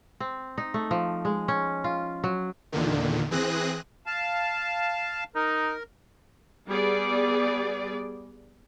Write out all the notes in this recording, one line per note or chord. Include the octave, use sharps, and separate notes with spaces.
C4
D#4
A3
F3
G#3
C#4
F4
F#3
E2 A#2 D3 D#3
E3 C4 G#4 D#6 F#6 A#6
F5 A5
D#4 A#4
G3 B3 G#4 D5